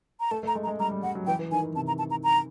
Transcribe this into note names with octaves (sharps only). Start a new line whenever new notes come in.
A#5
A3 A5
A3
A#5
G#3
A#5
G#3
G3 A#5
G3
G3 F#5
F#3
E3 G5
E3
D#3 G#5
E3
C3 A5
A#5
A5
A#5
A#5